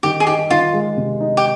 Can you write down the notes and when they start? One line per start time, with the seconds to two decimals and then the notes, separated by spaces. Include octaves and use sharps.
0.03 D#3 G4
0.20 G#4
0.27 D#4 G4
0.50 D#3 F4
0.73 G#3
0.97 C3
1.20 D#4
1.37 G4